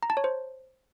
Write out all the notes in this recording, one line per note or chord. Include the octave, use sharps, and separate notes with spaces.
A#5
A5
C#5
C5